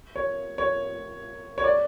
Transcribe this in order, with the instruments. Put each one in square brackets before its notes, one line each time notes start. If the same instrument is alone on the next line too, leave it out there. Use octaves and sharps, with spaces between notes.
[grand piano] C#5
C#5
C#5
D5